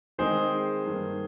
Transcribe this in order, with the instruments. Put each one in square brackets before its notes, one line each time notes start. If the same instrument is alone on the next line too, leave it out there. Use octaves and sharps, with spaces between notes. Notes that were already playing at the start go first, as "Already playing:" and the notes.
[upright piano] D#3 G#3 C4 D#4 [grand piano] G#4 C5
[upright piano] G2 D#3 A#3